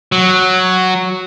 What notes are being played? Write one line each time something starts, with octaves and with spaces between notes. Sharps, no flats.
F#3